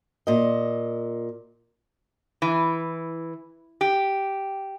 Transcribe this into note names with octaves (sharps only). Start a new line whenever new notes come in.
A#2 D#5
E3
G4